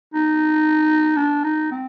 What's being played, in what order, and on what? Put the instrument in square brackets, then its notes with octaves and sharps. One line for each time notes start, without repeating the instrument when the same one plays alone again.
[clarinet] D#4
D4
D#4
C4